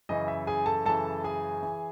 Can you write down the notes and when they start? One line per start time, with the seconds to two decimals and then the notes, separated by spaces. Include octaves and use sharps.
0.09 F#2 C#3 E3 D#5
0.28 E5
0.47 G#4 G#5
0.66 A4 A5
0.86 F#2 C#3 E3 A4 A5
1.24 G#4 G#5
1.63 E3